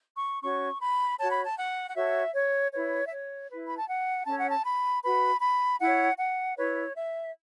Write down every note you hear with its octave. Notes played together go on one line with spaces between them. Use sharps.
C#6
C#4 F#4 C#5 C#6
B5
F#4 C#5 A5
B5
A5
F#5
F#5
F#4 A4 C#5 E5
C#5
E4 B4 C#5
E5
C#5
B4
E4
B5
A5
F#5
C#4 A4 C#5 A5
F#5
A5
B5
F#4 B4 B5
B5
E4 C#5 F#5
F#5
E4 B4 C#5
E5